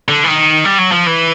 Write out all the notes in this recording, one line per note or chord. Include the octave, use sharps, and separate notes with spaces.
D3
E3
D#3
G3
F#3
F3
E3